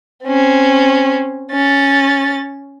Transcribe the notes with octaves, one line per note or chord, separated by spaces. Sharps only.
C4 C#4
C#4 A6